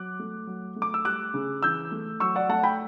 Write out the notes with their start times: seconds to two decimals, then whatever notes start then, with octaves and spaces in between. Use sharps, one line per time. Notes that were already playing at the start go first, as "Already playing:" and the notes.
Already playing: F#3 D6 F#6
0.19 A3
0.47 F#3
0.76 A3
0.82 D6
0.94 E6
1.05 G3 D6 F#6
1.34 C#3
1.63 E3 E6 G6
1.92 A3
2.20 F#3 C#6 E6
2.36 D5 F#5
2.49 A3 F#5 A5
2.64 G5 B5